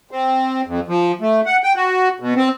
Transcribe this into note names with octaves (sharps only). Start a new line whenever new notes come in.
C4
F2
F3
A3
F#5
G5
F#4
B2
C4